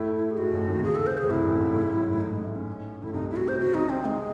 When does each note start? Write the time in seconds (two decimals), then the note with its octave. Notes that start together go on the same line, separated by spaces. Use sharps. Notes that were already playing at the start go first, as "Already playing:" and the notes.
Already playing: A2 A3 E4
0.31 G#4
0.37 G#2 G#3 F#4
0.53 A1 A2
0.69 D#2 D#3
0.78 C3
0.84 C#2 C#3 G#4
0.95 A4
1.07 C5
1.18 G#4
1.23 A2
1.29 C2 C3 E4
1.45 A1 A2
1.60 G#2
1.70 A2
1.76 G#2
1.87 F#2
1.99 G#2
2.10 A1 A2
2.21 D#4
2.33 G#3
2.44 A3
2.55 C#4
3.03 A2 E4
3.13 C2 C3 D#4
3.30 E4
3.36 F#4
3.48 C5
3.59 C3 F#4
3.66 C#3
3.74 C2 C3 D#4
3.90 C4
4.05 G#3